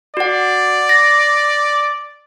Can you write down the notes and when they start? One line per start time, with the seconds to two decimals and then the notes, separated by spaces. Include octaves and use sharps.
0.17 F#4 D5 F#5
0.89 A#6